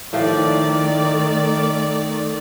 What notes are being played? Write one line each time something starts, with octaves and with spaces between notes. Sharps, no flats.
A2 D#3 F3 A3 G4 D5